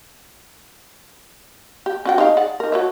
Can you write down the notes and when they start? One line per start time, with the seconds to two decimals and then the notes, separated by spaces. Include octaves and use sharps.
1.86 G4
2.05 C#4 F#4 G5
2.18 D#4 G4 F5
2.37 G#4 D5 F#5
2.60 D#4 A#4
2.72 F#4 C#5 E5